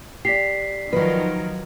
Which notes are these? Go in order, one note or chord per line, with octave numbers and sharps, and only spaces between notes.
G4 D5 B6 C7
D#3 F3 F#3 A#4 B4